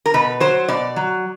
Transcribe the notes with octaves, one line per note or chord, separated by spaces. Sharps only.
A#4
B2 B4
F#3 C5
B2 D5
F#3